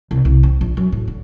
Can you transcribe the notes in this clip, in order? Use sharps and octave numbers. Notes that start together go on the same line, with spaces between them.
C2
C2
C4
A#1
F#2
A2
D3